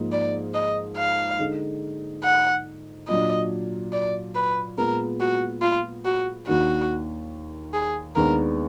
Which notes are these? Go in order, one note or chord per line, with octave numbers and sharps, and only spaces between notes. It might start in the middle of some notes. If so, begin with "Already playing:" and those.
Already playing: G#2 F3 A#3 D#4
D5
D#5
F5
D3 G#3 D#4
F#5
A#2 F#3 D4 D#5
D5
B4
A#2 G#3 B3 A#4
F#4
F4
F#4
D#2 D#3 A#3 D4 F#4
G#4
D#2 D#3 G#3 B3 D4 A#4